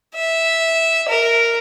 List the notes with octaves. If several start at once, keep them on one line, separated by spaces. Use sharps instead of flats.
E5
A#4